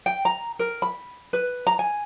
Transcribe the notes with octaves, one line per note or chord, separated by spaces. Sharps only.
G5
A#5
A#4
B5
B4
A#5
G#5